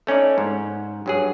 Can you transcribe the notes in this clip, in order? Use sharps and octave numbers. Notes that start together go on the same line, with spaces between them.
A3 C#4 D#4 D5
G#2
G2 F#3 G#4